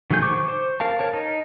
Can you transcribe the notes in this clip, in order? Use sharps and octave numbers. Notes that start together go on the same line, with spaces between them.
D#3 F#3 A3 G#4 G6
C5 C#6 D6
C5
A#4 F5 A5
A#4 C#5 A5
D#4